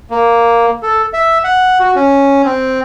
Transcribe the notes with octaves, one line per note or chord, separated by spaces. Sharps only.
A#3
A4
E5
F#5
F#4
C#4
C4